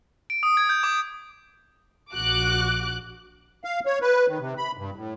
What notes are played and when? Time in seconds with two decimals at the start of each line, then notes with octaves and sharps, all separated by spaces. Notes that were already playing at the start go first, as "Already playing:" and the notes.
0.30 D7
0.43 D#6
0.57 G#6
0.69 G6
0.83 D6
2.13 A#1 F#4 D6 F#6
3.64 F5
3.86 C#5
4.02 B4
4.28 D#3
4.40 C3
4.58 B5
4.77 G2
4.96 A2